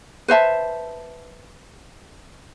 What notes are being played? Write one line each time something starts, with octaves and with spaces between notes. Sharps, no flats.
B4 C5 E5 A5